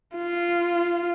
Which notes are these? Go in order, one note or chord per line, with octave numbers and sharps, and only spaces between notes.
F4